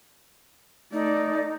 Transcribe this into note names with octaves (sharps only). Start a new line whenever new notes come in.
A3 D#4 D5